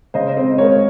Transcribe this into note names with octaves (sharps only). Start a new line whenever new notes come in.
C#3 C5 D#5
C4
G#3 A#4 C#5